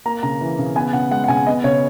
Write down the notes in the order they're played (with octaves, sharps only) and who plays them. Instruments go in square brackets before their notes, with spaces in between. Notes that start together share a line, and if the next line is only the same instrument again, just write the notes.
[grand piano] A#3 A#5
C#3 A#5
E3
C#3
B3 G#5
C#3 F#5
G#3 F#5
F#5
C#3 G#5
B3 D#5
C#3 C#5